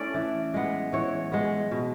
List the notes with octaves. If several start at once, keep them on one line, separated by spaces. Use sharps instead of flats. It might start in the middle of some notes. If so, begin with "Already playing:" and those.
Already playing: A3 C#4 E4 D5
E3
G#3 B3
E3 C#5
G#3 B3
B2